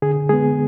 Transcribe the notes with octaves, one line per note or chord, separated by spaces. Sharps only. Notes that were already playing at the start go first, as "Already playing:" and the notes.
D3 G#4
G#3 B3 G#4